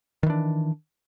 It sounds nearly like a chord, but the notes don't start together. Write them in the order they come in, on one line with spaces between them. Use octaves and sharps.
D#3 E3 D4